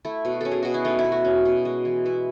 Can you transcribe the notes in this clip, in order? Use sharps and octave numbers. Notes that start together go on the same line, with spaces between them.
A3 E4
B2
C#4 A4
G#4
B2 F#4
E4
A3 D#4
E4
B2
F#4
C#4
B2
G#3
E3
B3 E4